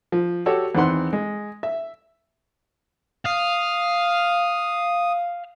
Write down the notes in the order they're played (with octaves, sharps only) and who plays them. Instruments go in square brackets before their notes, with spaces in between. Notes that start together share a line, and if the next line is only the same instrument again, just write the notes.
[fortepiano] F3
F#4 G4 A4 C#5
E2 D#3 C4 F#5 C6
G#3
E5
[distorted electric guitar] F5 [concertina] D#6